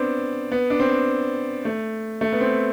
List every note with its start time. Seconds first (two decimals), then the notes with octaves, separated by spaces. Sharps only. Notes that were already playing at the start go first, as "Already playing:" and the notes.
Already playing: B3 C4 D4
0.52 B3
0.70 D4
0.80 C4
1.65 A3
2.21 A3
2.32 B3
2.41 C4